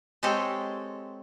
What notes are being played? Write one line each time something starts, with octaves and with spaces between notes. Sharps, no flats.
G#3 C4 G4 A4 C#5